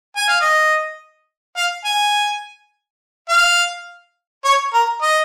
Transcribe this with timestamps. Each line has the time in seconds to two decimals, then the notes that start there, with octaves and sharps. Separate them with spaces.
0.17 G#5
0.28 F5
0.41 D#5
1.56 F5
1.85 G#5
3.29 F5
4.45 C#5
4.74 A#4
5.02 D#5